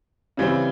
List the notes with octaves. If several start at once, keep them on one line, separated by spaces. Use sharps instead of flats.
C#3 E3 G3 C4